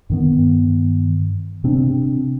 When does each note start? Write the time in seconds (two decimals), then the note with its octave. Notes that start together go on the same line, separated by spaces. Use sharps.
0.10 G2 D#3 B3
1.64 C3 C4 D4